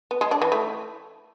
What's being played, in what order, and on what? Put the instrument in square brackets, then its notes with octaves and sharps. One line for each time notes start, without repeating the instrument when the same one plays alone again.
[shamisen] B3
G#3
D4
E3
A3